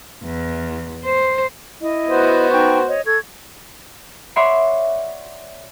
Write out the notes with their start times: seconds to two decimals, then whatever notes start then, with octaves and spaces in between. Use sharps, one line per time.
0.24 E2
1.05 C5
1.81 E4 D#5
2.07 B3 F#4 C5
2.51 D#4 G5 C#6
2.88 C#5 D#5
3.06 A4 C#6 G#6
4.36 C#5 D5 E5 F#5 B5 C6